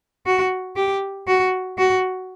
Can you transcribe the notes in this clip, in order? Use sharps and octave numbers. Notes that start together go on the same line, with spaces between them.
F#4
G4
F#4
F#4